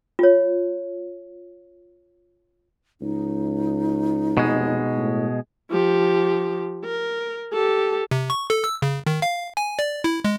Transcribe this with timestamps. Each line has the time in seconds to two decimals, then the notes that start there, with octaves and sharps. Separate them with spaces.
0.19 F4 C#5
3.01 C#2 D#4
4.37 F1 B2 G#3
4.97 A2
5.71 F3 G4
6.84 A#4
7.53 G4 A4
8.11 C3
8.30 C#6
8.50 A4
8.64 E6
8.82 C#3
9.06 D#3
9.22 F5
9.57 G#5
9.79 D5
10.04 E4
10.24 G#3